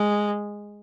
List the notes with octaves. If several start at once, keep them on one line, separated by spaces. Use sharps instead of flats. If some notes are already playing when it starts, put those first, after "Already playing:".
Already playing: G#3